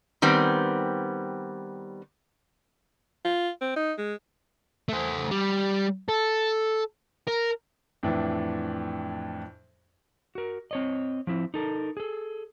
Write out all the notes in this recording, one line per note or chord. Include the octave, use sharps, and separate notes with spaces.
D#3 G3 B3 C4
F4
C4
D#4
G#3
A3 C5
G3
A4
A#4
F2 A2 E3 D4
F#4 A#4
C4 C#5 D#5
F3 C4 E4
D#4 A4 A#4
G#4 A4